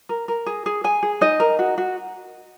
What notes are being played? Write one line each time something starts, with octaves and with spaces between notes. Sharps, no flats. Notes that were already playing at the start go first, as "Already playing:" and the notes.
A#4
A#4
G#4
G#4
G#4 G#5
G#4
D#4 D#5
A#4
F#4
F#4